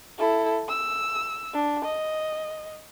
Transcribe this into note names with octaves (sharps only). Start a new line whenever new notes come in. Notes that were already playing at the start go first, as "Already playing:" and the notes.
E4 A4
E6
D4
D#5